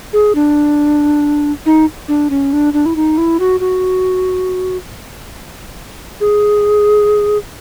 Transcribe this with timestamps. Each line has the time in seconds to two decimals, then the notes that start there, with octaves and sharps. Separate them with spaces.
0.13 G#4
0.35 D4
1.66 D#4
2.08 D4
2.30 C#4
2.53 D4
2.73 D4
2.86 E4
2.96 D#4
3.18 E4
3.40 F#4
3.60 F#4
6.20 G#4